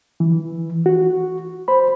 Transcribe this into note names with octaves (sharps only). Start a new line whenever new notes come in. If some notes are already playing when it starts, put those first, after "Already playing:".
E3
F#4
C5 B5